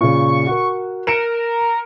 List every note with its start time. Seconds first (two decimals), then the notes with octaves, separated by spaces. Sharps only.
0.01 A#2 C#3 C#6
0.47 F#4 A#4
1.07 A#4 C#7 D7 E7